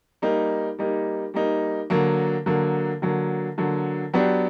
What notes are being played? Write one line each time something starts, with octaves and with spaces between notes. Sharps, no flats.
G3 A#3 D#4
G3 A#3 D#4
G3 A#3 D#4
D3 F#3 A#3
D3 F#3 A#3
D3 F#3 A#3
D3 F#3 A#3
F#3 B3 D4 G4